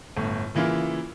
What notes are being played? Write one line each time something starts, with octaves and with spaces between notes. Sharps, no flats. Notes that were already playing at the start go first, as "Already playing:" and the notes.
G1 A2
C#3 E3 A#3 E4 F4